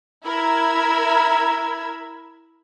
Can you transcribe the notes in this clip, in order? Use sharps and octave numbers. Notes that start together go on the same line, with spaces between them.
E4 A#4 B5 E6 G#6